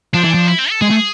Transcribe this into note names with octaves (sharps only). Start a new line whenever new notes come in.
F3 D4
E3
F3
E4
C4
A4
G#3 G#4
A3